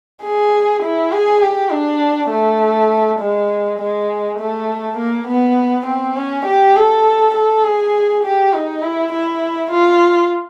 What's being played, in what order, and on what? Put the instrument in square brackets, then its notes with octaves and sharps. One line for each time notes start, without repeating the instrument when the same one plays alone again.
[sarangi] G#4
E4
G#4
G4
D4
A3
G#3
G#3
A3
A#3
B3
C4
C#4
G4
A4
A4
G#4
G4
D#4
E4
E4
F4